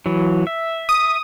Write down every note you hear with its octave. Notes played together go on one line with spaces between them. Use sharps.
E3 F#3
E5
D#6